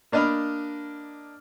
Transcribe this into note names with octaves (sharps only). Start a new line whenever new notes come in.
A#3 D4 D5 D#5 B5 F6